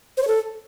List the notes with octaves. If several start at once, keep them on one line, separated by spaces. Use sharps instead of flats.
C5
C#5
A4